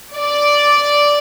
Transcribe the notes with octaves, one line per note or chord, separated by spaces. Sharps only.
D5